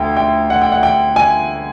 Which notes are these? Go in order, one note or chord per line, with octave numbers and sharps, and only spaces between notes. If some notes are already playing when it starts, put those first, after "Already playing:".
Already playing: D2 G5
G5
F#5
G5
F#5
G5
G#5